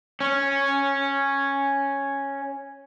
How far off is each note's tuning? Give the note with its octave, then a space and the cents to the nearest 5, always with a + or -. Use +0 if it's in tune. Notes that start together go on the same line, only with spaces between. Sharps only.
C#4 -5